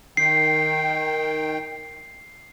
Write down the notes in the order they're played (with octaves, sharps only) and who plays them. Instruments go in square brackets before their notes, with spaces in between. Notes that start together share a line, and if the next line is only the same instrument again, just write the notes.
[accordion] D#3 G5 [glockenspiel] C7